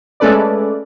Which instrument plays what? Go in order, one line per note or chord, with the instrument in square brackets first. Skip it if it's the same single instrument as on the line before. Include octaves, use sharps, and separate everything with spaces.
[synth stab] G#3 A3 C#4 A4 B4 D5